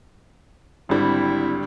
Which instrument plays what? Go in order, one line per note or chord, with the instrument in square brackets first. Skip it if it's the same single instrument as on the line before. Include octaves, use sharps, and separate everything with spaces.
[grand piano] G#1 D3 G3 [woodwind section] C4 E4